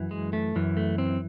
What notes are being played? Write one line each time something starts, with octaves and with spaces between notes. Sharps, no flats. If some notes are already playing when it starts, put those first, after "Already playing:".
Already playing: F#2 E3
G#3
A3
F#2 E3
A3
C4